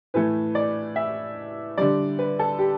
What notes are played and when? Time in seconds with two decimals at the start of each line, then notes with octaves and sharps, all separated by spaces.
0.14 A2 E3 A3 B4
0.55 D5
0.96 E5
1.78 D3 G3 D5
2.19 B4
2.39 A4
2.59 G4